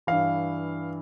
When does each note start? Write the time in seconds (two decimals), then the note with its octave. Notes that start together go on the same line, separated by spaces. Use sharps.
0.07 G2 E3 F5